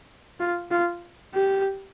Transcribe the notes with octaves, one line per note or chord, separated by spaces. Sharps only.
F4
F4
G4